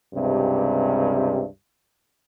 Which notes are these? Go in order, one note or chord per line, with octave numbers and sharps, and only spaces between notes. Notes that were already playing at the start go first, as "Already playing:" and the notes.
C#2 G2 C3